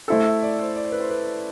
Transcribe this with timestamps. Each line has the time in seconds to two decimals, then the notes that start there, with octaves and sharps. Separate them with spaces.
0.08 A3 E4 A4 C5
0.25 E5
0.43 D5
0.59 C5
0.76 D5
0.84 C5
0.92 B4
1.00 C5
1.10 B4